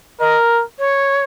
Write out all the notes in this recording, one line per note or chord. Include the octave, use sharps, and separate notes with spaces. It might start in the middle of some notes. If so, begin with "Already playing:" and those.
A#4 D#5
C#5